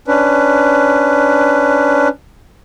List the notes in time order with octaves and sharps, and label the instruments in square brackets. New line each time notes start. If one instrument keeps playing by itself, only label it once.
[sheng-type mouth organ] C#4 D4 B4